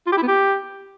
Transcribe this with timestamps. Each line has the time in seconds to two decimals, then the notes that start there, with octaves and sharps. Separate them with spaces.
0.06 F4
0.12 G4
0.17 E4
0.22 B3
0.28 G4